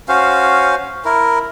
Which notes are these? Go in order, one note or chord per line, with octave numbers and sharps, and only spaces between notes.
C#4 F#4 C5 F5
E4 A#4